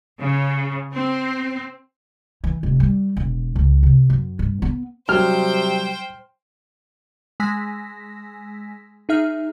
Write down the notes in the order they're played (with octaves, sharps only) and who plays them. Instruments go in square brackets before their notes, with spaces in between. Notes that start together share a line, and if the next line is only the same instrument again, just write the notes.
[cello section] C#3
C4
[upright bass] E3
F1
G3
E1
C#2
C3
F#2
G2
B3
[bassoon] C3 [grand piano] F#3 G3 [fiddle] C5 G5 [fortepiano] F6
[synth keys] G#3 G#5 E6 A#6 B6
D#4 G#4 E5 F6